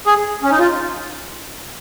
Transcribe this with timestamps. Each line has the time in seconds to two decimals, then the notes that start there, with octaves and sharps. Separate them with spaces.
0.06 G#4
0.43 C#4
0.51 D#4
0.59 F4